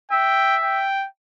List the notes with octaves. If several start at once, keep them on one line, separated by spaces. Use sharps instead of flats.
E5 G5
G5